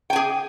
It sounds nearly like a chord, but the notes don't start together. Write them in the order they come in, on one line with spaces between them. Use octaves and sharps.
G5 G#5 G#4